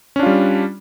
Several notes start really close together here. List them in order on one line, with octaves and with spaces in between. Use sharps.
C#4 D4 F4 G3